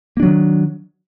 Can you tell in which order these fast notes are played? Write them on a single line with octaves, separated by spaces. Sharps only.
A#3 D4 F#3 D#3